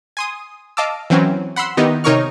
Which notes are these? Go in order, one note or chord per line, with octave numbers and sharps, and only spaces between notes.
G#5 C6 D#6
D#5 F5 A5 D6 E6
E3 F#3 C4 C#4
F#5 B5 C6 E6
D#3 B3 D#4 E4 G4
C3 D#4 A#4 C#5 C#6 F6